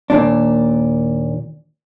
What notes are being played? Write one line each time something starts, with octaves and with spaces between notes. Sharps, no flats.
D#2 A#2 D4